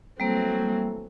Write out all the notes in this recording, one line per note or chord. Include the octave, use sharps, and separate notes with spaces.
E3 F#3 G3 A3 A#3 C4 A4